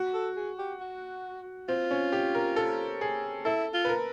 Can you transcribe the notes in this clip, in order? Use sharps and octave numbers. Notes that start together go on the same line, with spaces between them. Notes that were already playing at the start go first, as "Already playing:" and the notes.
Already playing: F#4
A4
G#4
G4
F#4
C4 F4
C#4
G4
A#4
A4
G#4
E4 A4
F4
B4
A#4